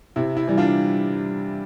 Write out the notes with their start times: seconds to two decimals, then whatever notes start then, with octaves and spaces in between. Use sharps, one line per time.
0.16 C3 E4
0.37 E4
0.48 E3 G3
0.57 D4 F4